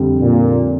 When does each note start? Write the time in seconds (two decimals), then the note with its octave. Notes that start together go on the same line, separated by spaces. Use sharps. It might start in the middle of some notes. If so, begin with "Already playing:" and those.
Already playing: F2 D3 G3
0.21 A#2